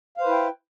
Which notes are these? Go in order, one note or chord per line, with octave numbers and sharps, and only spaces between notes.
E4 B4 C5 F5 G5